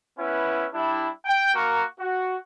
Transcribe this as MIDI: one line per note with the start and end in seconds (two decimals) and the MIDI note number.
0.18 0.66 59
0.18 0.66 61
0.18 0.66 64
0.18 0.66 71
0.73 1.09 55
0.73 1.09 62
0.73 1.09 64
1.25 1.54 79
1.55 1.84 58
1.55 1.84 66
1.55 1.84 70
1.55 1.84 85
2.00 2.36 66